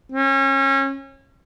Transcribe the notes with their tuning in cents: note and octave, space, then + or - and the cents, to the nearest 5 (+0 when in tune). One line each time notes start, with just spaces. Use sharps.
C#4 -30